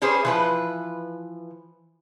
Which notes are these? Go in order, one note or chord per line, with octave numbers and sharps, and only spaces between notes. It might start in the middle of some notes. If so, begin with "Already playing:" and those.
C#4 G4 G#4 B4 C5
E3 F3 B4